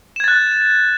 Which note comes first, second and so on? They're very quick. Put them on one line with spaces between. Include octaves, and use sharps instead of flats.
E7 G#6 A6 F#6